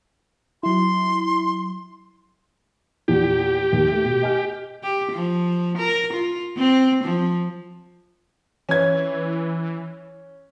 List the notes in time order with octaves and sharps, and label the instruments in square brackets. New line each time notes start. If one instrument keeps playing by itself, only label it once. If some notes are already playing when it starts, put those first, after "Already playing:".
[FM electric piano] F#3 E4 [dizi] C6
[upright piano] E2 A#2 [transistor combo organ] G4
[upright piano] D#2
A3 G7
B2
D#5 G#5 F6
[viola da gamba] G4
F3
A#4
F4
C4
F3
[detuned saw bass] E3 [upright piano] C#4 G#6